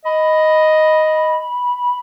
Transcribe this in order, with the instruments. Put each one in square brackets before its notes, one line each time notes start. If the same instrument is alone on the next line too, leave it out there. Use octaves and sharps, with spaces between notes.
[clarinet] D#5 [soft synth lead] B5